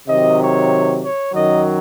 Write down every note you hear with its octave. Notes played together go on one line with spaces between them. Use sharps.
C3 D#3 F#3 D#5
C#5
C#5
F#2 D#3 F#3 D#5